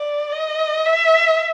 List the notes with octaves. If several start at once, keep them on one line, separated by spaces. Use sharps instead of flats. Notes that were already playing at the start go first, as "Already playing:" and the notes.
Already playing: D5
D#5
E5